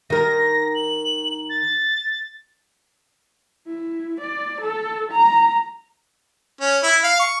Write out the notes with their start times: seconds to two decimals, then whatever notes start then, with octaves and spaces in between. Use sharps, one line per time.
0.10 D#3 A#4 A#6
0.75 F#7
1.50 A6
3.67 E4
4.21 D5
4.61 A4
5.12 A#5
6.61 C#4
6.83 E4
7.04 F5
7.19 C#6